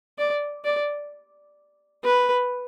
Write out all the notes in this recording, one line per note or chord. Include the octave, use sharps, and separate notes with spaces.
D5
D5
B4